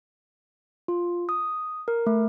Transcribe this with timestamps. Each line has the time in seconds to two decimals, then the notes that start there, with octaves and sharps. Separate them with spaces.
0.88 F4
1.29 D#6
1.88 A#4
2.06 A3